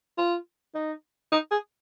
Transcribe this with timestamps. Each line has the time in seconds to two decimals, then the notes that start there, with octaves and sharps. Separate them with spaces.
0.18 F4
0.75 D#4
1.32 D#4
1.51 G#4